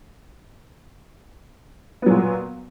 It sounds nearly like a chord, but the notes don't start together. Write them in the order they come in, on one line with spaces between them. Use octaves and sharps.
B3 F#3 A#2